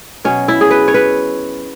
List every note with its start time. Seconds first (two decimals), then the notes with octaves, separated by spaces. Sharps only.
0.25 B2 F#3 C#4
0.48 E4
0.61 G#4
0.71 B4
0.88 C#5
0.94 B4